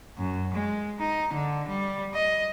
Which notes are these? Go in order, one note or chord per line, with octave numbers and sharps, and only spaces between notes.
F#2
G#3
D#4
D3
G3
D#5